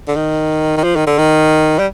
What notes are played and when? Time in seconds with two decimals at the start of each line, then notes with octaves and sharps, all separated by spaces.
0.08 D3
0.16 D#3
0.77 D#3
0.84 F3
0.96 D#3
1.07 D3
1.18 D#3
1.79 G3